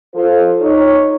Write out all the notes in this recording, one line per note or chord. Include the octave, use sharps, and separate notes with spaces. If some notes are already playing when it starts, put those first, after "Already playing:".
F3 F4 A4 C5
D#4 C#5